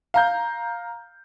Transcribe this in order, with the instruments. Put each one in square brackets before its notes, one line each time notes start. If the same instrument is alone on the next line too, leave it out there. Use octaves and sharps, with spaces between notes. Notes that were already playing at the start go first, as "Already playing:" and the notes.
[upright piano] F5 A#5 G6